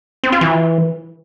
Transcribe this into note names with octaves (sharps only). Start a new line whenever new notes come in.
C4
F4
E3